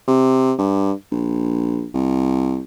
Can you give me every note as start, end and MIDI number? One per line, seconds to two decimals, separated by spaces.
0.08 0.53 48
0.58 0.92 43
1.11 1.86 34
1.94 2.61 36